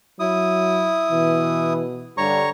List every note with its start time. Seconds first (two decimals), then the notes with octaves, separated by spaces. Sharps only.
0.20 F#3 E4 D#6
1.11 B2 E3
2.17 G2 D3 G3 C#5 A#5 C#6